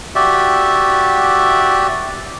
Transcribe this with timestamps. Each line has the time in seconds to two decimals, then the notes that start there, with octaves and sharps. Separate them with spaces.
0.15 F#4 G4 D5 E5